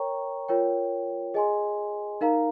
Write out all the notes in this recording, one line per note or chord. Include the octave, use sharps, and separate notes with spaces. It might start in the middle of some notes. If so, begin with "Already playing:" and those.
Already playing: A#4 C#5 G5 A#5 C#6
F4 A#4 C#5 G5
G#4 D#5 G#5 C6
D#4 A#4 F5 A#5